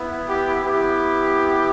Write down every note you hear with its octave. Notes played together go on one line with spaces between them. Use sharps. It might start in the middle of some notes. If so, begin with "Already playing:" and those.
Already playing: B3 E4
G4
B3 E4 G4